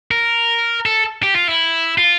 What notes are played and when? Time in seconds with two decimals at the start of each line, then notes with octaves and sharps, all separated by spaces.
0.11 A#4
0.86 A4
1.23 G4
1.35 F4
1.48 E4
1.98 F4